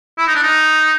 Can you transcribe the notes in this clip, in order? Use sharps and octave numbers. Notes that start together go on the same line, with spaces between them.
E4
D#4
D4
D#4